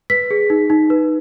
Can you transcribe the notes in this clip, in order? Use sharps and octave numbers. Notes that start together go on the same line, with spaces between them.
B4 B6
G#4
D#4
D#4
B4